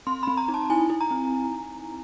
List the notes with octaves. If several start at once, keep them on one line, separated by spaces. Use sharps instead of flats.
C4 C6
C4 B5
A#5
D#4
A5
E4 G#5
E4
A#5
C4